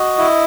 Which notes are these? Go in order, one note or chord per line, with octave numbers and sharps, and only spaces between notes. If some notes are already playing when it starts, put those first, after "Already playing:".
Already playing: F#4 D#5
E4